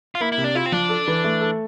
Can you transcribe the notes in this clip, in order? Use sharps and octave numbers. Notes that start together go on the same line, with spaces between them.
F4
A#3 E4
E4
C3
D4
E4 F4
C4
F3 D4
A4
E3
A3
A4